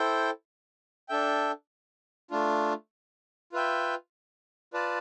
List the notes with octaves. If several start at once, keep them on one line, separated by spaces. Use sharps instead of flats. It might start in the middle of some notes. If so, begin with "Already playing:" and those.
Already playing: E4 A4 C5 G5
D4 A4 E5 G5
A3 D4 F4
F4 B4 E5 G5
F4 B4 D5 A5